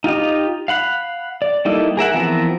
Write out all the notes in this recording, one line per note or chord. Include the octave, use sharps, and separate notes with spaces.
D#4 F4 G4 D#5
F5 F#5 B5 F#6
D5
G3 A#3 D#4 E4 A4
G#4 A#4 E5 F#5
E3 F3 B3 C4 A#4